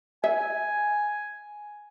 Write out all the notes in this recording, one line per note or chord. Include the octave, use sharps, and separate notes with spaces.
E5 G#5